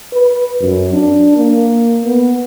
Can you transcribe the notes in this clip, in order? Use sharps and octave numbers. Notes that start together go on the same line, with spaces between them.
B4
F#2
D4
A#3
B3